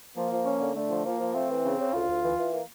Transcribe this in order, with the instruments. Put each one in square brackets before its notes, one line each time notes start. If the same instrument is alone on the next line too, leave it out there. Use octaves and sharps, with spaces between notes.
[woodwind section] F3 [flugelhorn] A#3
[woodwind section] F3
C#4
D3
[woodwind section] D3 [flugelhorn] A3
[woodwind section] F3
[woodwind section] F3 [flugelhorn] A#3
[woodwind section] F3
[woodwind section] A3 [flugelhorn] C4
[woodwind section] E3
C#3
C#3
[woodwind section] D2 [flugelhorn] F4
[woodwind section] D2
E3
E3
A#3